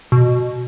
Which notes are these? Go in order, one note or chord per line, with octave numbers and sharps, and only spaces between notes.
B2